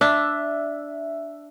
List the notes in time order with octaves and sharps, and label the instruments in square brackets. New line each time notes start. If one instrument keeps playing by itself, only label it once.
[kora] D4 [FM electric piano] E5